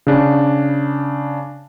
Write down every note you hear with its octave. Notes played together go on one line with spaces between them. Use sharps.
C#3 D4